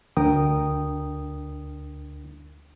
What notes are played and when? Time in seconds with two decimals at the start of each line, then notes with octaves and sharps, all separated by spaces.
0.17 D2 D4 A#4 G5 D#6